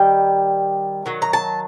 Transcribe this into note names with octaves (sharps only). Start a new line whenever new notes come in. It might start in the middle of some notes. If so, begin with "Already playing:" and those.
Already playing: D#3 G3 G5
D#3 F#3
A#5
A5